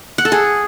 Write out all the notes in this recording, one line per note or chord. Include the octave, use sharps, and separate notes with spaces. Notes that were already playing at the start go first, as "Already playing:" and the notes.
F#5
A4
G#4